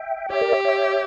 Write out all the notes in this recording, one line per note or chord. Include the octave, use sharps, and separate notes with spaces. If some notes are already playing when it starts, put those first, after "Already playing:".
Already playing: E5 G5
G4 C#5 E5
A#4 D5
C#5 E5
C#5 E5